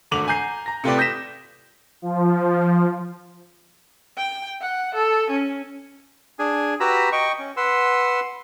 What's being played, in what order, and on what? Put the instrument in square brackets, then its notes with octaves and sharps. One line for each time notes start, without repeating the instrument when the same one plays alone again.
[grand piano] G#1 D2 A3 D6 F7 F#7
G#5 A#5 G6 C7
A#5 A#6
C3 A3 F4 G4 B4 D5
D#6 G6 A#6 B6 E7
[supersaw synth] F3
[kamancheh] G5
F#5
A4
C#4
[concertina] D4 G#4 G#5
F#4 G4 B4 A#5 B5 E6
D#5 G5 C#6
C#4
B4 F#5 C6 E6